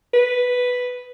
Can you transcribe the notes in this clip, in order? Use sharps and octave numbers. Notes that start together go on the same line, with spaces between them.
B4